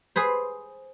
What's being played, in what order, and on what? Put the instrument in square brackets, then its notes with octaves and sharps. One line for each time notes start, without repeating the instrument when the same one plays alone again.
[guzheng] G#4 B4 C5